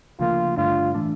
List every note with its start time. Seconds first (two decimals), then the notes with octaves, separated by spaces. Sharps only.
0.19 D2 C#3 F3 A#3 F4
0.57 G2 D3 A3 D4 F4
0.94 A2 E3 A3 D4